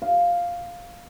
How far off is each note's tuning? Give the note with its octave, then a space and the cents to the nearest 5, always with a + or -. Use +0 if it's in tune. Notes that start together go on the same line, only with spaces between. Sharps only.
F5 +0